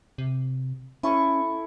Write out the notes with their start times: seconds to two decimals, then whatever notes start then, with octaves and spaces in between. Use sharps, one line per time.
0.18 C3
1.03 C#4 E4 A4 C#6